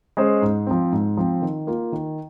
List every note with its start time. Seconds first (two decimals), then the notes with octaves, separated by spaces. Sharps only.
0.17 G#3 C#4 G#4 C5
0.42 G#2
0.67 F3 C4
0.92 G#2
1.17 F3 C4
1.42 D#3
1.67 A#3 F4
1.92 D#3